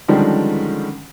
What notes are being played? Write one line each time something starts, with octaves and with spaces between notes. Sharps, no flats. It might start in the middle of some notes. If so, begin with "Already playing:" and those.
D3 D#3 F3 G3 G#3 C#4